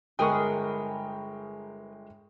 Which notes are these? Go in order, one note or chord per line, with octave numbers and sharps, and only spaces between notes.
G1 G#3 G#4 A#4 B4 G5 B5 C#6